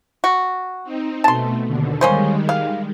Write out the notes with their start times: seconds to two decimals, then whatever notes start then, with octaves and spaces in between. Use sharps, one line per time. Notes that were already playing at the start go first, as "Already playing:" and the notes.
0.24 F#4
0.84 C4 D#4
1.24 B2 A3 A5 C6
1.67 D#2 B2 D3
2.01 D#3 G3 G#3 A#3 C#4 C5
2.49 F5